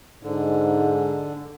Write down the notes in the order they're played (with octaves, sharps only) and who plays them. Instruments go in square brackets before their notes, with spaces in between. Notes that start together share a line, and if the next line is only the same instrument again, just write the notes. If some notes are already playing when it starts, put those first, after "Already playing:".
[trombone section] G#2 [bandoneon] D3